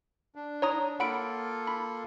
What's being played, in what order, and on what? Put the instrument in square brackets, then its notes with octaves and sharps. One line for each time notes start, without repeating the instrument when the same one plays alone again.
[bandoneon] D4
[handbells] C#5 A#5 D#6
[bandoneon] A#3 F4 A4 [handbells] F#5 B5 D7
[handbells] B5